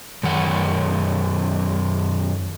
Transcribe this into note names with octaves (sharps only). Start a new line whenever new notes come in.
F#2 D#3 F#5